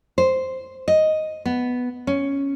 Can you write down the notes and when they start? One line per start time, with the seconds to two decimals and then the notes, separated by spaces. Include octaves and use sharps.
0.18 C5
0.88 D#5
1.45 B3
2.07 C#4